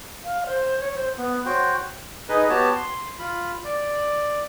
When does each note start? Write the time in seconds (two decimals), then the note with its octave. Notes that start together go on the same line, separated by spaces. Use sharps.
0.24 F5
0.46 C5
0.79 C#5
0.95 C5
1.17 B3
1.46 F#4 C5 C#5 G5
2.29 D#4 G#4 B4 D#5
2.49 B3 F#4 G4 C#5 A5
2.75 C6
3.19 F4 B5
3.64 D5